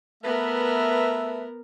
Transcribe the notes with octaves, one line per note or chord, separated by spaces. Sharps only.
A3 B3 A#4 B4 E5